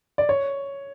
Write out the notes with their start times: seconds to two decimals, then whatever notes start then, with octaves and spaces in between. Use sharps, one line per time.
0.18 D5
0.29 C#5